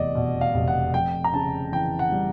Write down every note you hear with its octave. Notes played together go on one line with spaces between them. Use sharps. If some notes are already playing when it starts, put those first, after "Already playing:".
Already playing: F1 E2 D5 D#5
B2
F5
F1
F#5
F2 G5
A#5
C#3 A5
E3 G5
F#5
G3